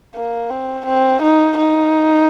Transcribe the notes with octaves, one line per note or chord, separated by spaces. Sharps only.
A#3
C4
C4
D#4
D#4